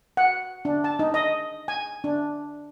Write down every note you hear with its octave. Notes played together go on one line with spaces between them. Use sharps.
F#5
D4
A5
D#4
D#5
G#5
D4